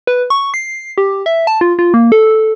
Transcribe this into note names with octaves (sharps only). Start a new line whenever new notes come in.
B4
C#6
C7
G4
E5
A5
F4
F4
A#3
A4